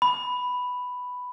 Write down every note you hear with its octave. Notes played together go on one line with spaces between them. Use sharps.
B5